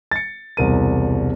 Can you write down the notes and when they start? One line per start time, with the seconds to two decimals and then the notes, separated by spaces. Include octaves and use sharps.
0.11 A6 C#7
0.57 E1 C2 A#4 D#7